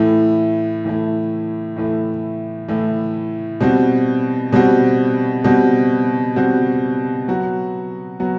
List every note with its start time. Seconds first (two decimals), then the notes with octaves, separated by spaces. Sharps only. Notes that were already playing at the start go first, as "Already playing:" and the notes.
Already playing: A2 E3 A3 E4
0.84 A2 E3 A3 E4
1.76 A2 E3 A3 E4
2.68 A2 E3 A3 E4
3.60 B2 G3 C4 F#4
4.52 B2 G3 C4 F#4
5.44 B2 G3 C4 F#4
6.36 B2 G3 C4 F#4
7.28 F#3 B3 F#4
8.20 F#3 B3 F#4